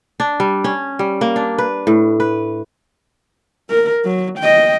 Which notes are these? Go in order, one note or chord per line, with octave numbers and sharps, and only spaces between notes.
D4
G3
C#4
G3
A#3
D4
B4
A2
B4
A#4
F#3
D#5 G5